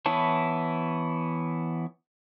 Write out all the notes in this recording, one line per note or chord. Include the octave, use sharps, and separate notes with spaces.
E3 B3 E4 C#5 A5